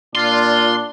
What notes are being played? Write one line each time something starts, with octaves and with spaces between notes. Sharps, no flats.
A#2 D4 F4 C6